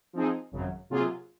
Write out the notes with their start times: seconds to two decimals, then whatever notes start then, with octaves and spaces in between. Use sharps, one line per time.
0.13 F3 C4 D#4 G#4
0.52 G#1 F#2 C#3 F#3
0.90 C3 F#3 A#3 F4 G#4